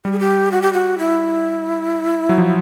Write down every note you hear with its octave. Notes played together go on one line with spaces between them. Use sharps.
G3 G4
G#4
G4
F#4
G4
F#4
E4
F#3
F3